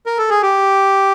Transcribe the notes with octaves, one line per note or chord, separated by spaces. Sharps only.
A#4
A4
G#4
G4